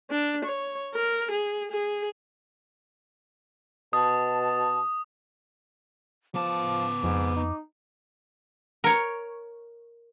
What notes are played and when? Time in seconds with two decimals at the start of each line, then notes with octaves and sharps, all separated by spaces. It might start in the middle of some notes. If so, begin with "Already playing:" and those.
0.10 D4
0.45 C#5
0.95 A#4
1.31 G#4
1.71 G#4
3.93 B2 A5 D#6
6.35 F3 B3 A5 D6
7.04 F2 G#2
7.36 D#4
8.84 A#4 C#5